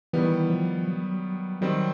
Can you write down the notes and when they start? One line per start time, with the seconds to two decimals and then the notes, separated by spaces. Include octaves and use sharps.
0.13 D#3 E3 G3 B3
0.50 F3
0.88 F#3
1.61 D#3 F#3 G3 C4